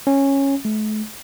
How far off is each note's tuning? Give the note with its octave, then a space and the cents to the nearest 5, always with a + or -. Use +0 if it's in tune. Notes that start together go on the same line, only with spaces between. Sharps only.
C#4 -10
A3 -40